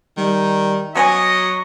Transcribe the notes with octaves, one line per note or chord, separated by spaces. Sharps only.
D#3 G3
F#3 B3 C#5 D#5 G#5 C#6